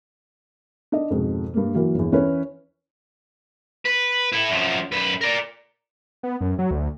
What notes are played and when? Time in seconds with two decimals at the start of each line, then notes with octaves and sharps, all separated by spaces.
0.92 D4 D#5
1.10 F2 G#2 B2
1.54 G2 A#3
1.74 E3 F#3 A#3
1.95 G1 E2
2.12 E3 C#4 E4 A#4 B4 C#5
3.85 B4
4.32 E4 A4
4.50 F#2 F3
4.92 F#2 B4
5.21 A#4 D5
6.23 B3
6.41 F#2
6.59 F#3
6.71 D2